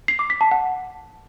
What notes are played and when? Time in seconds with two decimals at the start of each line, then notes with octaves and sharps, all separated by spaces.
0.08 C7
0.19 D6
0.30 B6
0.41 A5
0.51 F#5